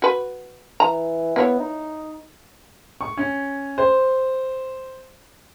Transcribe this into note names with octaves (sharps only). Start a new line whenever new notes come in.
F#4 B4
E3 A#5
A#3 B3 E4 C#5
D#4
C#6
C#4
C5